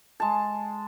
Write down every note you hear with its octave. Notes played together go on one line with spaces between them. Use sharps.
G#3 A5